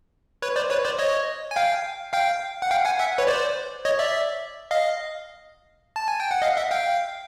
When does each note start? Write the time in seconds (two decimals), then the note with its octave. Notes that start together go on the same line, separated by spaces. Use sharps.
0.42 B4 C#5
0.56 C5 D5
0.70 B4 C#5
0.85 C5 D5
0.98 C#5 D#5
1.51 G#5
1.56 F5 G5
2.13 F5 G5
2.62 F#5
2.71 F5 G5
2.85 F#5 G#5
3.00 E5 F#5
3.18 B4 C#5
3.27 C5 D5
3.85 C#5 D#5
3.99 D5 E5
4.71 D#5 F5
5.96 A5
6.08 G#5
6.20 G5
6.31 F#5
6.42 D#5 F5
6.57 E5 F#5
6.71 F5 G5